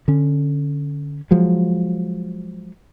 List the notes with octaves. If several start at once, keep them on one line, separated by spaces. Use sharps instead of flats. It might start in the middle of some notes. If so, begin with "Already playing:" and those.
D3 C#4
F3 F#3 G#3